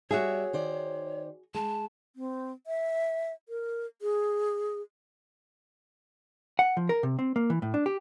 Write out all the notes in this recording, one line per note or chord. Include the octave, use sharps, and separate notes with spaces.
G3 F#4 G#4 C#5 E5
D#3 C5 D5
G#3 A5
C4
E5
A#4
G#4
F#5
F3
A#4
C3
C4
A#3
E3
A2
D4
G4